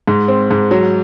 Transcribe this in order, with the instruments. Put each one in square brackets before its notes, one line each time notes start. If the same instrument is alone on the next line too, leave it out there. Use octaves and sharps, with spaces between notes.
[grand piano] G#2
C4
G#2
F#3